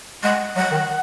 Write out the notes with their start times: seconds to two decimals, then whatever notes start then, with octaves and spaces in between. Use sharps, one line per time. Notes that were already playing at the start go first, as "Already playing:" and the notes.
0.24 G#3 F#5
0.56 F#3 F#5
0.71 D#3